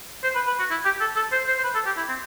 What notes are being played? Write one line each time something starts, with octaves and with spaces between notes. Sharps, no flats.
C5
B4
B4
F#4
E4
G4
A4
A4
C5
C5
C5
B4
A4
G4
E4
C4